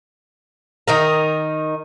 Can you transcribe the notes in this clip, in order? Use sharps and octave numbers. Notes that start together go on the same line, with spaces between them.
D#3 D#4 A#4